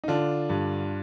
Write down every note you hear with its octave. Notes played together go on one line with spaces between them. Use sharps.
D#4
D3 D4 F4
G2